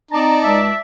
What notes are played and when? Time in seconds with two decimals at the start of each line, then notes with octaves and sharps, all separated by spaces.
0.11 C4 D#4 D5 A5 A#5
0.44 C#2 E5